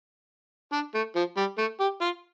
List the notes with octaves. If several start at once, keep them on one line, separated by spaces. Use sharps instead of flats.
D4
A3
F3
G3
A3
G4
F4